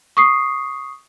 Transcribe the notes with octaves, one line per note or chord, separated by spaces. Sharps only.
C#6 D#6 C7